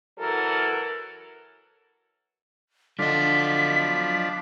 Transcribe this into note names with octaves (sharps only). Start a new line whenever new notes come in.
E3 F#3 A4 A#4
D3 F3 F#3 D4 D#5 B6